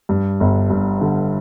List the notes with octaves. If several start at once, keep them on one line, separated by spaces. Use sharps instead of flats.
G2
G1
G2
D3